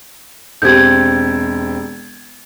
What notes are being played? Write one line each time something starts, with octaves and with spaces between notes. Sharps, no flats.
E1 C4 G4 G6 G#6